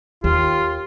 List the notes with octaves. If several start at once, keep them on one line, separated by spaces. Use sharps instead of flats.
D#2 F4 G4